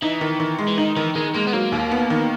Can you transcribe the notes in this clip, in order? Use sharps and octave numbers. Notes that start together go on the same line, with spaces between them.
E3 D#4
D#3
D#3
G#3
E3
D#3 D#4
D#3 E3
D#3 G#3
G#3 A#3
B3
F#3 A#3
D#2
B3
D#3